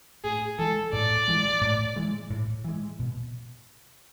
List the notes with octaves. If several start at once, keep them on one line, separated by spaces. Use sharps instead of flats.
A2 G#4
E3 G#3 A4
A2 D5
E3 G#3
A2
E3 G#3
A2
E3 G#3
B2